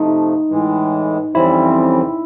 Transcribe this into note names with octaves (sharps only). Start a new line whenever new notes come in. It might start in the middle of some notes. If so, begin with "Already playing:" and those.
Already playing: C3 F3 A3 D#4
A2 E3 G#3
F2 C#3 E3 G3 C4 E4